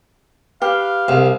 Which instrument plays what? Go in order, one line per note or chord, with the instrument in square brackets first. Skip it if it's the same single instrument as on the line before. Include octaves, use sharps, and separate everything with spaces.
[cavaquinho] G4 [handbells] B4 [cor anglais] F5
[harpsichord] C2